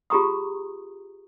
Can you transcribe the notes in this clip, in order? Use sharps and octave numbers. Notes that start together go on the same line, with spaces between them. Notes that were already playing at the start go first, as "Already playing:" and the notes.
F4 G4 G#4 A#5 C#6 D#6